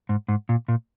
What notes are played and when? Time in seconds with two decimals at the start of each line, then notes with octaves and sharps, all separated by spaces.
0.09 G#2
0.28 G#2
0.49 A#2
0.68 A#2